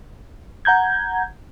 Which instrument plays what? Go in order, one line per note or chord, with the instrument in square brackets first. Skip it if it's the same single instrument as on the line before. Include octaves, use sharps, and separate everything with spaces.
[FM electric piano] F#5 A#5 G6 G#6